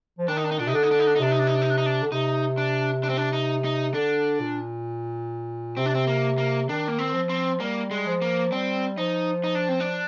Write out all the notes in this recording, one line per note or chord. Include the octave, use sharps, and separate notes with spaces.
F3
D#3 D4
D#4
D4
D#4
A#2 D4
C3 D#4
D3 D4
D#4
D4
D#4
D4
D#4
C3 D4
D#4
D4
D#4
D4
D#4
D4
D#4
D4
D3
C3 D#4
D4
D4
C4
D4
D#4
D#4
D3 D4
A#2
C3 C4
D4
C4
A#3
A#3
D#3 D4
A#3
C4
F3
C4
G3 A#3
G#3
F3
A#3
G3 C4
F3 D#4
D#4
D4
C4
D4